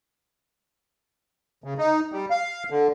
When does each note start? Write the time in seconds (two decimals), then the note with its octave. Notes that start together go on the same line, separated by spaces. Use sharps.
1.64 C#3
1.78 D#4
2.12 G3
2.30 F5
2.70 D3